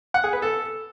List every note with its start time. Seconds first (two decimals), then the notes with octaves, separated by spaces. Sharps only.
0.14 F#5
0.24 G#4
0.33 B4
0.42 A4